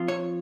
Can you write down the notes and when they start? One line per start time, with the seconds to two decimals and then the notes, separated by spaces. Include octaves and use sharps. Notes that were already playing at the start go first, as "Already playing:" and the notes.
Already playing: F3 C4 F4
0.08 C#5